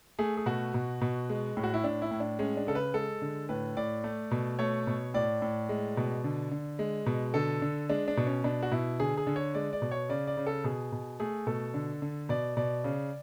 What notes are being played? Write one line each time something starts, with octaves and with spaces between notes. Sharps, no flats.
A3 G#4
G#4
B2 F#4
B2
B2
G#3
A2
F#4
E4
A2 D4
E4
A2
D4
G#3 C#4
D4
C#3 A4
B4
G#3 A4
D3
A2 B4
A2 D5
A3
B2
A3 C#5
B2
A2 D5
A2
G#3
B2
D3
D3
G#3
B2
D3 A4
D3
G#3 D4
D4
B2
C#4
B2 D4
F#4
B2 E4
D3 G#4
G#4
D3
C#5
G#3 D5
D5
B2
C#5
C#3 D5
D5
C#3
A4
B2 G#4
B2
A3 G#4
B2 A4
D3
D3
B2 D5
B2 D5
C#3